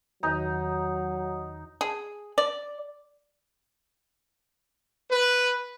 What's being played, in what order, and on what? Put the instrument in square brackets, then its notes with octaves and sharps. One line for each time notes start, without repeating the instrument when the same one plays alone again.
[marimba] E2 D#3 B4 [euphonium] F#3 [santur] D#4
[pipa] G#4
D5
[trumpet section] B4